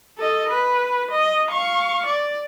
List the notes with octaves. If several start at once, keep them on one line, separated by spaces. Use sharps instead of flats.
A4 D#5
B4
D#5
F5 C#6
D5